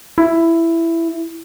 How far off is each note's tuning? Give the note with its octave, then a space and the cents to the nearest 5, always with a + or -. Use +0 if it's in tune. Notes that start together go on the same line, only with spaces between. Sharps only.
E4 +10